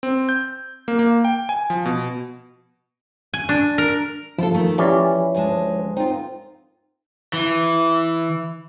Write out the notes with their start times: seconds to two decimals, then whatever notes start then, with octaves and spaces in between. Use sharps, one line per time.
0.03 C4
0.29 G6
0.88 A#3
0.99 A#3
1.25 G5
1.49 G#5
1.70 F3
1.85 B2
3.34 G#5
3.49 D4
3.78 A#4
4.38 F3 E4 F4 A4
4.54 D#3 A3
4.78 E3 C#4 G4 D5
5.35 D2 G#3 A5
5.97 C4 D#4 F4
7.33 E3